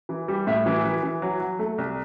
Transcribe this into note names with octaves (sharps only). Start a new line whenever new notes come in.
E3
G3
A2 E5
E3
E3
E3
F#3
F#3
A3
C2